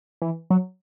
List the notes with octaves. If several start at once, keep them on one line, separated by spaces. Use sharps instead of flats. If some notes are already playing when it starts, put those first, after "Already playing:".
E3
F#3